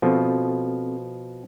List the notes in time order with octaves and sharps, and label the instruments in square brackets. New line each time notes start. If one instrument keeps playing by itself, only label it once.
[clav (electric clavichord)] B2 F3 [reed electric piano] C4 A4